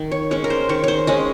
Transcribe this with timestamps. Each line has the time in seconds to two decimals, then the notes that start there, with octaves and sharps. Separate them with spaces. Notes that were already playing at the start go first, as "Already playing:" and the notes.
Already playing: D#3
0.11 C#5
0.31 G#3 C#4 C#5
0.44 A#4
0.50 C5
0.69 D#3 C#5
0.84 C5 C#5
1.07 G#3 C#4 D#5